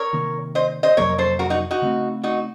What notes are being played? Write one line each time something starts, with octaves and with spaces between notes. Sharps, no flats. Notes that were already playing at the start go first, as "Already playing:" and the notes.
Already playing: A#4 C#5
C3 D#3 A#3
C5 D#5
C5 D#5
F2 C3 F#3 A#3 A#4 C#5
A4 C5
F#4 A#4
D#4 F#4
D#4 F#4
C#3 A3 C4
D#4 F#4